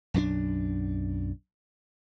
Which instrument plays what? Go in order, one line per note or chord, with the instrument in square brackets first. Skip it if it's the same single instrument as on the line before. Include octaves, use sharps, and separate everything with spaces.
[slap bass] B1 F#2 D#3 D4